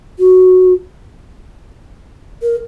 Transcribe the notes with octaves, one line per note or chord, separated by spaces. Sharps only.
F#4
A#4